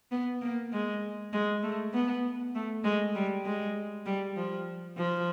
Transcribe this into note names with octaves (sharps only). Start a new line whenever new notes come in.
B3
A#3
G#3
G#3
A3
B3
A3
G#3
G3
G#3
G3
F3
F3